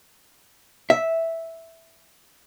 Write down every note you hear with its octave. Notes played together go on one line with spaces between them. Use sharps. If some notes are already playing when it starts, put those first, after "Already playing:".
E5